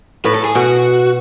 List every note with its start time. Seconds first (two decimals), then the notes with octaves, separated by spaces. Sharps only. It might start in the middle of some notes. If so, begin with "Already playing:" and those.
0.25 A2 B4
0.35 A4
0.45 G#4
0.55 B2 F#4